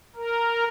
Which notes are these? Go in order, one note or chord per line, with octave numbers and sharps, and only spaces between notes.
A#4